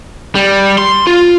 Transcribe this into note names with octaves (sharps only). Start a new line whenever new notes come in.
G3
C6
F4